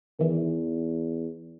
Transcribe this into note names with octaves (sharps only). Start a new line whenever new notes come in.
E2 D#3 E3